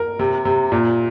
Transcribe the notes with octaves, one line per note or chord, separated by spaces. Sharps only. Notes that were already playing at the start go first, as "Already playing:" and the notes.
Already playing: A#4
C3
C3
A#2